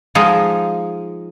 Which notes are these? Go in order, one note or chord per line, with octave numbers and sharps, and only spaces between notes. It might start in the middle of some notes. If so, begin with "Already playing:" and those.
F3 G#3 D#4